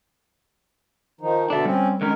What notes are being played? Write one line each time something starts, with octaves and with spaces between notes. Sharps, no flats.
D#3 F3 D#4
B2 D3 D4 A4 E5
G3 C4 C#4
D3 D#3 G#3 C#4 A#4